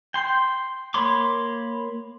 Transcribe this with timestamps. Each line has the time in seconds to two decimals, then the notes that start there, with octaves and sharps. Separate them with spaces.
0.14 G5 C6
0.94 A#3 C#5 B5 C6 D6